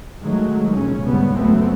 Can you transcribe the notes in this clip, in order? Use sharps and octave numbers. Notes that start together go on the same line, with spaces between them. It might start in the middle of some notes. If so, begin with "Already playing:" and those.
D#3 F#3 G#3 A3
F1 A#1 C#3 C#4
D2 G#2 C#3 G3 B3
C#2 F#2 F#3 A3 B3 C4